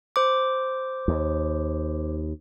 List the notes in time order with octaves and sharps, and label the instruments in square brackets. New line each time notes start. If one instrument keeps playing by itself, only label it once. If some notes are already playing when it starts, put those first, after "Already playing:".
[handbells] C5 D6
[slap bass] D#2